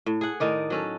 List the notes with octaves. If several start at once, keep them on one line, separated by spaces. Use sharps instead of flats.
A2
G#4 F#5
A2 D#3 D#4 D5
F#3 C#4 A4